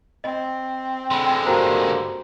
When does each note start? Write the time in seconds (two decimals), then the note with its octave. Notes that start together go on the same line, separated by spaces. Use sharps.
0.24 C4 D#5
1.11 D3 G#3 G5 B5 C6
1.47 G2 A#3 F#4 C5 A#5